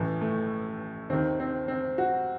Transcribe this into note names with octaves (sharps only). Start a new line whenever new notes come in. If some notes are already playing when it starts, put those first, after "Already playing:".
Already playing: A1 A2 E3
A3
D#2 D#3 C4
C4
C4
F#4